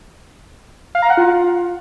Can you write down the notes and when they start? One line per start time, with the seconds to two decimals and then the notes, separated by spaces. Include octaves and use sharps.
0.95 F5
1.02 A#5
1.10 F#5
1.17 F4